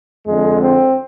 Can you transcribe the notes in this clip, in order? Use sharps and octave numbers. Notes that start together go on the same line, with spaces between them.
F2 D3 G#3
C4